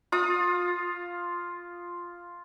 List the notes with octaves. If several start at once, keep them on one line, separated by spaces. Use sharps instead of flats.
F4 D#6